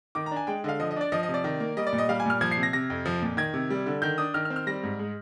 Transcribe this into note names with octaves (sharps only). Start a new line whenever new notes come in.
D#3 D6
D4 A#5
G#5
G#3 G5
D3 D#5 F5
F3 D#5
D#5
D4 D5
F3 D#5
D#5
C3
D5
D#3
A#3
G3 D#5
D5
A#2
D#5
G3 F5
G#5
A#2 F6
F3 G#6
C7
C3
A#6
C3 A#6
F2
F3
A#2
D#3 G#6
C3
G3
D3
D#3 G6
D4 D#6
D#3 F6
F6
C4
F6
G3 A#6
G#2
G#3